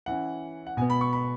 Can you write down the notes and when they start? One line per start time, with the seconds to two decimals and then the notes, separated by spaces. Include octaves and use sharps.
0.06 E3 C#4 F#5
0.67 F#5
0.77 B2 G#5
0.81 B3
0.90 B5
1.01 C#6
1.13 B5